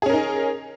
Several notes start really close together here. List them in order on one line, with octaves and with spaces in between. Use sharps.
G#4 C#4 A#4 D#4